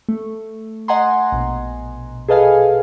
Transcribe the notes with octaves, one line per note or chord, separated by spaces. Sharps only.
A3
D#5 F#5 G#5 A#5 C6
A#1 B2
G#4 A4 B4 D#5 F5 G#5